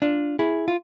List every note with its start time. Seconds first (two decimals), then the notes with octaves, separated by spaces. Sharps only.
0.02 D4 F4
0.39 E4 G#4
0.68 F4